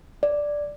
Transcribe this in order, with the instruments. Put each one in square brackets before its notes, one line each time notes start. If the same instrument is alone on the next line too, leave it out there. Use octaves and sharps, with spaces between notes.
[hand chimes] D5